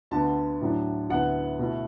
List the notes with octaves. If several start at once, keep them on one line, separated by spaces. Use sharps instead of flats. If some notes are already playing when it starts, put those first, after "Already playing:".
D2 D3 B3 A5
A2 F#3 D4
D2 D3 B3 E4 F#5
B2 A3 E4